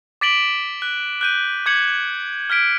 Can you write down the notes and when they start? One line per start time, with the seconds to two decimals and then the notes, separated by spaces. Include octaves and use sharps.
0.21 D6 A6 B6 D7 F#7 G7
0.82 F#6
1.21 F#6 G6 D#7
1.66 D6 G#6 C#7 F#7
2.50 F6 G#6 B6 D7